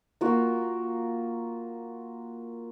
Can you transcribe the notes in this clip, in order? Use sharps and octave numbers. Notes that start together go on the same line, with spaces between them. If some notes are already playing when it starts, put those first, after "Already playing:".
A#3 F4 F#4